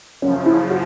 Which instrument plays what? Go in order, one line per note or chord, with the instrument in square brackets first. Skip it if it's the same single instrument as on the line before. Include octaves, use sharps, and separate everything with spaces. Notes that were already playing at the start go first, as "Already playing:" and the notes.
[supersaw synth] F#2 [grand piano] C#4
[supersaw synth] C#3 F3
[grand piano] E4
F#4